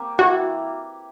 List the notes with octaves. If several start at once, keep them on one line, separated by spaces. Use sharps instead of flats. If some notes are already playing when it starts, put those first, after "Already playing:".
Already playing: A#3 C4 G4
E3 F#4